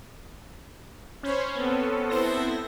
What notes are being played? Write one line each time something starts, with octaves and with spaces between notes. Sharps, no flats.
C#4 C5 C#5 B5
B3 C4 A4
E4 C5 A#6